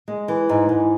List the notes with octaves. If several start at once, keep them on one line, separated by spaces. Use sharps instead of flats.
G#3
E3
G#2
G#2